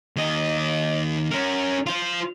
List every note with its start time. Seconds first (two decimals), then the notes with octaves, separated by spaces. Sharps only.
0.16 D#2 D#5
1.31 C#4 A#4
1.86 F4 C5